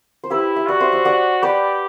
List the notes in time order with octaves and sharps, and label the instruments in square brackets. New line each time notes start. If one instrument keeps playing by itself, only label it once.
[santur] C5
[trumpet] E4 [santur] G4 B4
[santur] E5
[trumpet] F#4 [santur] B4 D5
[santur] C5 E5
C5 E5
D5 F#5
[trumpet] G4 [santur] B4 D5